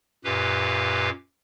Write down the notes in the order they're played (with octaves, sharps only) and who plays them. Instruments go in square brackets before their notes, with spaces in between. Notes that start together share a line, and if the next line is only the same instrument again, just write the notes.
[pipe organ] F#2 A#2 G4 B4 F5